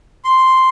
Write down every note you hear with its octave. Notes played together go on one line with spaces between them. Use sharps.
C6